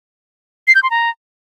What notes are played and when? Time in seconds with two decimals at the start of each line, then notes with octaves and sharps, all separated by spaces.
0.68 C7
0.75 G6
0.83 C6
0.91 A#5